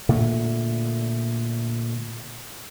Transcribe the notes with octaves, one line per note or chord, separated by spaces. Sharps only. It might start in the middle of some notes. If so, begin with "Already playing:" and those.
A#2 D3 A3